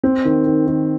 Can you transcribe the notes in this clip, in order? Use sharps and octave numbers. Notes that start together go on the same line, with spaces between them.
C4
D#3
D#3
D#3